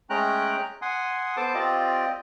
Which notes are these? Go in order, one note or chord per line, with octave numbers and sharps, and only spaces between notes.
G#3 A3 C#4 G5 A#5 F#6
F#5 G#5 C6 D#6
B3 A4 C5 A5 D6
C4 F4 G4 D5 D#5